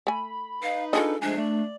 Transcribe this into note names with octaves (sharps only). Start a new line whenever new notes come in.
A3 G#5 B5
D#4 B4 F5
D4 F4 G#4 A4 D#5
F3 G#3 A3 D4 G#5
A3 D5